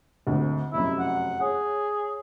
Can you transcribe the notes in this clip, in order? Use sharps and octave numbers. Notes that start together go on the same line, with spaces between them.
G#1 D2
F1 F#2 E4
F#5
G#4 C#5